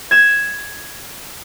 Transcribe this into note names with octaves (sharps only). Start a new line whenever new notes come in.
G#6 E7